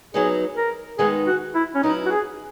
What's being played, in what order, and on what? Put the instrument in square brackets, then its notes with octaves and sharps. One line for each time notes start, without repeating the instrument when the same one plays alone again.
[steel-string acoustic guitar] F#3 B3 D#4 [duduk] G#4
[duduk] A#4
[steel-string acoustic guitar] D#3 G#3 B3 D#4 [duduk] G#4
[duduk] F#4
E4
C#4
[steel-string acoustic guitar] F#3 B3 E4 [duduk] D#4
[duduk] F#4
G#4